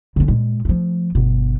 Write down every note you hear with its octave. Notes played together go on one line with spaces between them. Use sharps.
D3 C#4
A#2 G#3
F3 A3
G1 B2